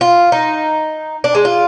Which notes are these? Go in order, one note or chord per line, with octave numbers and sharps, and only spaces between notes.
F4
D#4
D4
G#3
F4